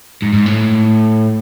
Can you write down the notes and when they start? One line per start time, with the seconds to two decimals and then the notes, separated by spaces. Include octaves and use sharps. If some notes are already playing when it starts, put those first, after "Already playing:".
0.22 G#2
0.33 G#2
0.46 A2